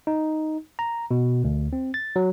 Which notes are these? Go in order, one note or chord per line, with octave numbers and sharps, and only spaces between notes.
D#4
A#5
B2
D2
C4
A6
F#3